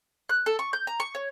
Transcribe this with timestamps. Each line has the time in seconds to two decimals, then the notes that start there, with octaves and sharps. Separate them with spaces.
0.29 F#6
0.46 A4
0.59 C#6
0.73 G6
0.87 A#5
1.00 C#6
1.15 C#5